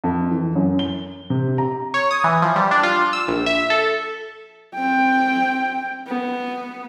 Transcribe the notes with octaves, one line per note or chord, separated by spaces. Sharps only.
F2
E3
F#2
G7
C3
A#5
C#5
D#6
E3
F3
G3
D4
F4
E6
A#1
E5
A4
C4 G5
B3